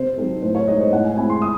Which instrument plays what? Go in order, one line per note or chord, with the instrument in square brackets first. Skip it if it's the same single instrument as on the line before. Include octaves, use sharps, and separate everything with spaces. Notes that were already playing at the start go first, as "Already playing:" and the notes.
Already playing: [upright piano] C3 C5
F#3 C4 D#4 A4
A2 C5
C#5
G#3 D#4 D#5
C5
A2 F#5
G#5
G#3 C4 E4 G#5
C6
D#6